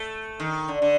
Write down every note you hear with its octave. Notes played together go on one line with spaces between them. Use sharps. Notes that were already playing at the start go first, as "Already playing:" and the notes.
Already playing: A3
D#3
D3
D3